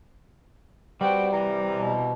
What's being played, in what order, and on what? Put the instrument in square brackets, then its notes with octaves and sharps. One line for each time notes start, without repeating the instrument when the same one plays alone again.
[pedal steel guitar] G3 [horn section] B3 C4 F#4 [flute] G5
[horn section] C3 E3 [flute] A#5
[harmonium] B2